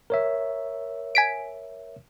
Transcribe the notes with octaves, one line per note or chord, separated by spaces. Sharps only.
A#4 C#5 E5
G#5 B6 D7